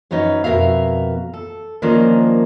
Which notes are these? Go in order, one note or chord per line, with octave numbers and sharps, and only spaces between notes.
F#2 B3 C#4 D#4 C#5
F2 B2 B3 A#4 E5 F5
A4
D#3 F3 A#3 C#4 D4 F4